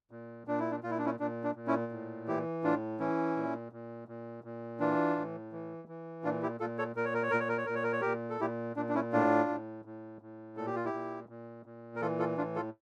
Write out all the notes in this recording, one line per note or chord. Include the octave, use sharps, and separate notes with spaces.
A#2
A#2 D4
E4
D4
A#2 F4
E4
D4
C#4 E4
A#2 D4
D4
A#2
C#4 E4
A2
E3 E4 G4
A2 D4 F4
E3 C#4 E4
A#2
A#2
A#2
A#2
E3 D4 F4
A2
E3
E3
A#2 D4 F4
E4 G4
A#2 F4 A4
A4 C#5
A#2 A#4
C#5
A#4
C#5
A#2 A#4
C#5
A#4
C#5
A#2 A#4
C#5
A#4
C#5
A#2 G4 A#4
A4
A#2 E4 G4
A#2 D4
D4
C#4 E4
A2 D4 F4
A2
A2
A2
A#2 A4
G4
F4
E4 G4
A#2
A#2
A#2
A#4
E3 F4 A4
F4 A4
A2 D4 F4
F4 A4